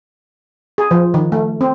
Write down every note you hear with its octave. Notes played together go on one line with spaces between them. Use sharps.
G#4
F3
D#3
A3
C4